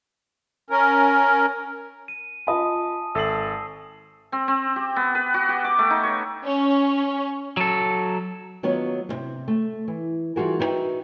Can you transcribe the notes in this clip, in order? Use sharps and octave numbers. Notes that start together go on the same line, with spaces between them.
C#4 A#4
D#7
F4 D#5 G#5 A5 B5 D#6
G#1 A4 E5 E6 C7 F#7
C4
C4
G4
B3
B4
F#4
G4
D6
A3
D#4
C#5
C#4
F#3 A4
D#3 F#3 B3 F4 B4 C#5
D2 C3
A3
E3
E3 G3 F4 F#4 G#4 A#4
D#4 E4 F#4 B4 E5 G5